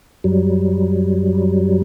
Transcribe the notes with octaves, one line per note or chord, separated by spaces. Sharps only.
F#2 F#3 G3